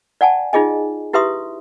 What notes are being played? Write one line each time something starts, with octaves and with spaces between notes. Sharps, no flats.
D5 F#5 G#5 A5
D#4 F4 G#4 D#5 G#5
E4 G4 B4 E5 C6 D#6